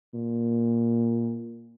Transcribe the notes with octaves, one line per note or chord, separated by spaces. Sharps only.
A#2